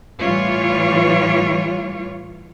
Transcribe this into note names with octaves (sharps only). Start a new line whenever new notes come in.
A2 E3 G3 F4 C#5